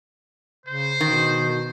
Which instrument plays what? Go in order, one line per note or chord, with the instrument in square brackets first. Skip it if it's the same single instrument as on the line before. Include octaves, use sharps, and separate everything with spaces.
[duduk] C#3 [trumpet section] C5
[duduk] B2 [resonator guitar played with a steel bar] D#3